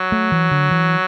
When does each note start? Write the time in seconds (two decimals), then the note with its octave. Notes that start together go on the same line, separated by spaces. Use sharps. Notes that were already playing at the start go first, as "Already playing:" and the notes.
Already playing: F#3
0.12 A3
0.32 E3
0.51 D3
0.71 E3